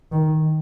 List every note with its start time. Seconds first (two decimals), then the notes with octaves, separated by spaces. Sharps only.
0.12 D#3